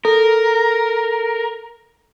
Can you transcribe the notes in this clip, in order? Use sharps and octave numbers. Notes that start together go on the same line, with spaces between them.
A4 A#4